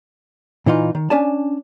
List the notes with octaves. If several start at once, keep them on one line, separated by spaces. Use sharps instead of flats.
A#2 E3 D#4 F4
D#3
C#4 D4 G#5 A5